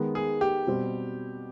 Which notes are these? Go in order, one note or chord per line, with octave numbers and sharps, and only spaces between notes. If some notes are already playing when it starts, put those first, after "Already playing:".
Already playing: D#3 G#3 B3
G#4
G4
B2 G3 C4